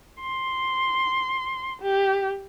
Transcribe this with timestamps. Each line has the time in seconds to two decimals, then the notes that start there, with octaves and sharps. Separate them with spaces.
0.20 C6
1.82 G4